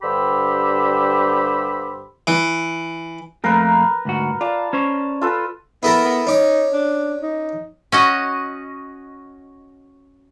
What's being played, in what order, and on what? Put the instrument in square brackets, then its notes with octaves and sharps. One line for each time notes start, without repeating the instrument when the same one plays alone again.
[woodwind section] G2 D3 G4 C5 B5 E6
[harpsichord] E3
[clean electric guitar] F2 A3 A#3 [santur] A#4 B4
[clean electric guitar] D2 G#2 F#4
[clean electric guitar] F4 [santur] D5 A5
[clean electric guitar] C#4 C5 C#5
[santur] F4 A4 B4
[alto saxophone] B3 [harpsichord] E4 A4 A#4
[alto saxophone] B3
[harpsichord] C#4 D6 [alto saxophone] D#4
[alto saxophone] D4
D#4
[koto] C#4 F#4 D#5